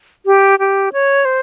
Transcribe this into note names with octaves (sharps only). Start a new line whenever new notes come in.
G4
G4
C#5
C5